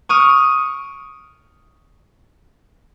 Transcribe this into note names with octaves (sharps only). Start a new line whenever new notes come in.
C#6 D#6 F6 D7